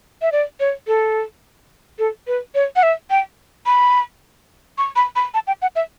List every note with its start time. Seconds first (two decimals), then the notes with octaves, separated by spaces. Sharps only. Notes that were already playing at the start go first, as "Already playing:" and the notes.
0.22 E5
0.32 D5
0.60 C#5
0.87 A4
1.99 A4
2.27 B4
2.55 C#5
2.76 F#5
2.83 E5
3.10 G5
3.66 B5
4.78 C#6
4.96 B5
5.16 B5
5.34 A5
5.47 G5
5.62 F#5
5.76 E5